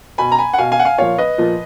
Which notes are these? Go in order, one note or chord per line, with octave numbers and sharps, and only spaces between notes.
B2 G#5 B5
A#5
G#5 B5
F#5
B2 F5 G#5
F5 G#5
F#5
F5 G#5
A#2 F3 C#5 F5
B4 D#5
A#2 F3